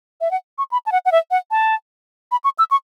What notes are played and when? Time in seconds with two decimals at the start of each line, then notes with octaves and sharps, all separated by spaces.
0.21 E5
0.31 F#5
0.58 C#6
0.71 B5
0.86 A5
0.92 F#5
1.05 F#5
1.12 E5
1.31 F#5
1.51 A5
2.32 B5
2.44 C#6
2.59 E6
2.71 C#6